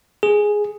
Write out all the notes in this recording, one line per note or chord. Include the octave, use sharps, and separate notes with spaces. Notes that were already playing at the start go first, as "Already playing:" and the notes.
G#4